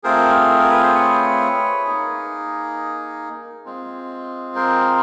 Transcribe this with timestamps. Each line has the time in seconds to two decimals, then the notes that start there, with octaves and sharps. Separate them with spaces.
0.04 A3 C4 F4 G#4 A#4 C5
0.59 A#4
0.70 B4
0.83 C5
0.94 B4 C#5
1.85 A#3 D#4 G#4
3.66 G#3 C4 F4
4.56 A#4 C5